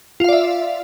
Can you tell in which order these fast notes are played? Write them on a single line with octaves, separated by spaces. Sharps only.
F4 F5 D5 E5